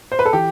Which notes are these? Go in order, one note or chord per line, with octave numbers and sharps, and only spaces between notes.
C5
B4
A4
E3 G4